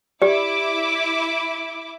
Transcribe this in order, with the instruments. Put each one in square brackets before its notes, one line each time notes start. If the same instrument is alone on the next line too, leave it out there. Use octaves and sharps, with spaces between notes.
[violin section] E4 D6 [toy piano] G4 D5